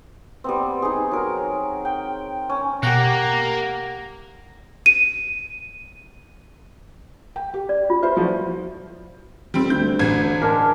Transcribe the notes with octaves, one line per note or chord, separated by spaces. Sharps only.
G3 B3 C4
D#4 G#4
F#3 A#4
G5
C#4
B2 A#3 G4 F#5 A#5
D#7
G5
G4
D5
F4
E4 F4 B4 C5
F3 F#3 F#4
D#1 G3 C4
D2 G6
A1 G#6
G#3 D4 A#4